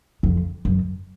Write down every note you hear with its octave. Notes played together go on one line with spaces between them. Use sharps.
F2
F#2